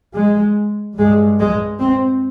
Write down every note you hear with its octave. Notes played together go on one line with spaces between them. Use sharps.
G#3
G2 G#3
G#3
C4